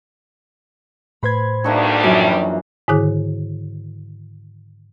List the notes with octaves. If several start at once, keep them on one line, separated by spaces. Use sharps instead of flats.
A2 B4 C5 B5 G#6
D2 G3 A#3 D4 D#4 G5 C#6 E6
F#2 E3 F3
G#2 D3 D#3 E4 G#4 F#6